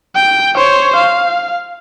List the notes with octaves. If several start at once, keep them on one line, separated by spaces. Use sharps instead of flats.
G5
C5 C#5
F5